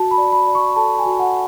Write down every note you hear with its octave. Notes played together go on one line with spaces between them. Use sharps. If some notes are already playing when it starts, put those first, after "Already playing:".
Already playing: F#4 A5
B5
D5
B5
D5
C#6
A4 A5
G#5
F#4
F#5